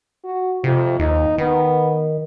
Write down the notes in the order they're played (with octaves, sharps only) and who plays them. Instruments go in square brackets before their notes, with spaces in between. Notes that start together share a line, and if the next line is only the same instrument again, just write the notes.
[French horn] F#4
[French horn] F2 [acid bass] C3
[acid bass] D#2 [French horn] D#4
[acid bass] D#3 [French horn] B3